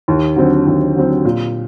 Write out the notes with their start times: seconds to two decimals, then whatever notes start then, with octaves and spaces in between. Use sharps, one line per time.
0.08 D#2
0.36 D3 F#3 C4
0.67 D#2
0.96 D3 F#3 C4
1.25 A#2